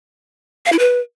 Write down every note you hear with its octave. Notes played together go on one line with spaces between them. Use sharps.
F5
E4
B4